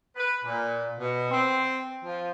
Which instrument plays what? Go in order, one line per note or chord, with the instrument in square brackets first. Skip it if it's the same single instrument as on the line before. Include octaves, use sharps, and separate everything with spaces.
[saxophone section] B4
A#2
B2
C4
F3